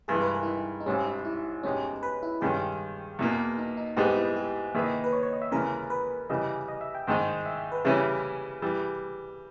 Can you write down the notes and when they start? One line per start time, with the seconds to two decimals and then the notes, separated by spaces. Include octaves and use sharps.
0.08 G2 E3 G#3 G#4
0.22 B4
0.35 A#4
0.43 E4
0.47 D#4
0.80 D#4
0.86 G#1 G#2 G3 C#4
1.06 D#4
1.25 E4
1.63 E2 B2 G#3 C#4 D#4 G4
2.03 B4
2.23 E4
2.41 G2 D#3 G#3 C#4 G4 G#4
3.19 E2 B2 A#3
3.58 D#4
3.77 D#4
3.97 G#2 G3 B3 D#4 G4 G#4
4.16 E4
4.36 G4
4.75 D#3 A#3 E4 G#4 B4 E5
4.84 D#5
5.04 B4
5.13 C#5
5.23 C#5
5.33 D#5
5.42 E5
5.52 D#2 C#3 E3 G#3 C#4 A#4
5.90 B4
6.30 C#3 E3 G3 D#5
6.68 D#5
6.81 E5
6.95 G5
7.07 G#2 D#3 G#3 D#4 G5
7.46 E5
7.72 B4
7.85 C#3 E3 G3 C#4 E4 G#4
8.62 E3 G3